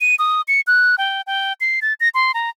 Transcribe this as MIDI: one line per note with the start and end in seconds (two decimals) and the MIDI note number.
0.01 0.15 99
0.19 0.41 87
0.48 0.61 97
0.67 0.95 90
0.98 1.22 79
1.27 1.53 79
1.61 1.80 96
1.82 1.94 93
2.00 2.09 94
2.14 2.32 84
2.34 2.50 82